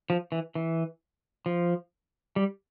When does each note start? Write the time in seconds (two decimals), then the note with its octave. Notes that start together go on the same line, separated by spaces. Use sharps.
0.10 F3
0.32 E3
0.55 E3
1.46 F3
2.36 G3